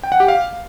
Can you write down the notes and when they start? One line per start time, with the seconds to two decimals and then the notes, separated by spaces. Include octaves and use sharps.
0.03 G5
0.12 F#5
0.20 G4
0.28 F5